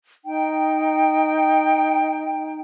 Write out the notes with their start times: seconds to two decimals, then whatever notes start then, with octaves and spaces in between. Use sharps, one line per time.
0.24 D#4 G5